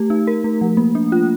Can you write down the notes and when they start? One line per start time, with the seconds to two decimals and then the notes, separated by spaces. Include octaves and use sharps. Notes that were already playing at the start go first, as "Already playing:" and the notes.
Already playing: A3 G4
0.10 D#4
0.27 A#4
0.44 A3
0.61 F3
0.77 A#3
0.95 D4
1.12 F4